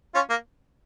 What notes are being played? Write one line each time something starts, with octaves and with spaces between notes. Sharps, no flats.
C#4 F4
A#3